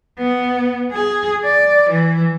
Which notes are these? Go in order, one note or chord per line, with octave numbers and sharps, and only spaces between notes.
B3
G#4
D5
E3